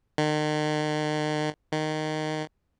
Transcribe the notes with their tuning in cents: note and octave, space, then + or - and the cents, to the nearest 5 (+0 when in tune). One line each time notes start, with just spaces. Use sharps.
D#3 -40
D#3 -10